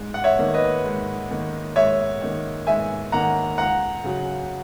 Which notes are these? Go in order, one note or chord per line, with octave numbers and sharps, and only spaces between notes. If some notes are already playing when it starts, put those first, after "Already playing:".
Already playing: G#2
F#5
C#5 E5
D#3 A#3
B4 D#5
G#2
D#3 A#3
G#2 C#5 E5
D#3 A#3
G#2 E5 G#5
D#3 A#3 F#5 A#5
C#2 F#5 A#5
C#3 F#3